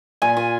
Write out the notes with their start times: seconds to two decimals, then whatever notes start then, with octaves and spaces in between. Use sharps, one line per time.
0.22 A#2 G#5
0.37 A#2